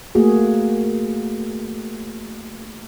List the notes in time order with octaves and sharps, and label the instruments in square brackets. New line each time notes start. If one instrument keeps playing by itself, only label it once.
[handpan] A3 A#3 F#4 G#4